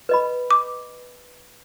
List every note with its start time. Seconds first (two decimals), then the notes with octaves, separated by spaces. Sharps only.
0.09 B4 D#5 B5
0.51 D6